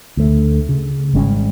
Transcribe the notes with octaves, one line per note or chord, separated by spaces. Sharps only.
D2 A3
C#3
G#1 G3 G#3 C#4